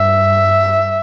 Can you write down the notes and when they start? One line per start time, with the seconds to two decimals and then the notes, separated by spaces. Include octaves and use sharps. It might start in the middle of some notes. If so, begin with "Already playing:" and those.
Already playing: G2 E5